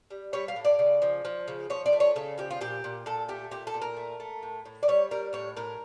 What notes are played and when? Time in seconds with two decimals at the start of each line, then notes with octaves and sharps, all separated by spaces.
0.10 G3
0.33 G3 C#5
0.48 F5
0.56 A2
0.65 D5
0.79 C#3
1.02 F3
1.25 F3
1.48 C#3
1.70 F3 C#5
1.86 D5
1.93 A3
2.00 C#5
2.16 C#3 A4
2.38 F3 G4
2.51 F4
2.61 A#2 G4
2.84 A#2
3.06 A#2 A4
3.28 A3 G4
3.51 A#2 G4
3.67 A4
3.74 A#2
3.82 A#4
3.97 A3
4.20 A3
4.43 A2
4.65 A2
4.83 D5
4.88 G3 C#5
5.11 G3 A#4
5.33 A2 C#5
5.56 A2 A#4